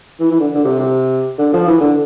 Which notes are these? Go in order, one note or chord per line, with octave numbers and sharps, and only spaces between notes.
E3
E3
D3
D3
C3
C3
D3
F3
E3
D3